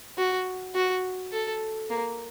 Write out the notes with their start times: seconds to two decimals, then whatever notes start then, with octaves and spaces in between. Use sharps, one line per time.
0.18 F#4
0.75 F#4
1.32 A4
1.90 A#3